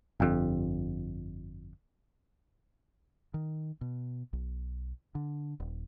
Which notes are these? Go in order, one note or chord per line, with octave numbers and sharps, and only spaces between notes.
G1 F2
D#3
B2
B1
D3
D#1